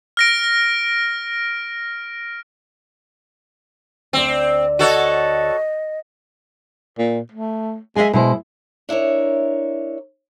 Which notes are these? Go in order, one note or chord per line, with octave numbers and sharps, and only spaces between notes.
F6 A#6 D7
D2 C4 D5
F#4 A4 C#5 D#5
A#2
A3
G#3 E5 G#5
B2 G#3 E4 C5
D4 E4 A#4 C#5